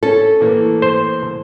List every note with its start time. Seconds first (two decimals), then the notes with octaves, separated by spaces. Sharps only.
0.03 C#4 A4
0.40 A2 E3 A#3
0.82 C5